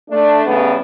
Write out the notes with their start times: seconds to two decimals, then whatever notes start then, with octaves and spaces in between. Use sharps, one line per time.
0.10 A3 D4
0.46 A2 C#3 G3 B3